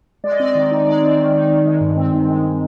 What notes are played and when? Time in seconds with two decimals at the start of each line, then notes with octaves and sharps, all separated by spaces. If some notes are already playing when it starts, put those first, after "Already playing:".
0.24 G#3 D5
0.32 D#5
0.40 C4 D5
0.55 D#3
0.71 D#4
0.87 G#3 D5
1.03 C4
1.19 D#3
1.35 D#4
1.50 D#3
1.66 G#3
1.81 G2
1.97 C4
2.12 D#3
2.28 G#3